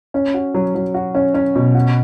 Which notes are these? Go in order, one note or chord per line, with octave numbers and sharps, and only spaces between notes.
C#4
F#4
F#3
F#3
F#4
C#4
C#4
B2
F#4